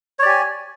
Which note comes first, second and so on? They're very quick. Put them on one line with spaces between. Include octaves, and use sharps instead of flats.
C#5 D5 G4 G#5